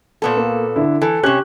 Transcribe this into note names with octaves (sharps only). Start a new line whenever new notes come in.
A#2 B3 A4
A#3
D3 D4 E4
E3 A4
C3 C#4 G4 F#6 F#7